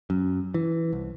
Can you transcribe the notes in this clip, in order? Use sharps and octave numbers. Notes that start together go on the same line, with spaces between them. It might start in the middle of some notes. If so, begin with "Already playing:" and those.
F#2
E3
C2